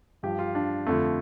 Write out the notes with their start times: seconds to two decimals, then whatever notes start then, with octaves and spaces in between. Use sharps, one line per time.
0.23 G2 F3 G4
0.39 F4
0.55 D4
0.86 F2 D3 F3 A3